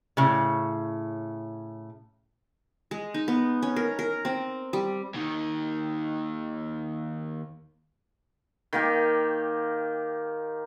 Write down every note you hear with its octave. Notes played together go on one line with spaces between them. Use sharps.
A2 C#3
G#3
D#4
B3
C#4
A#4
A#4
C4
G3
D#2 D#3
D#3 A#3 G4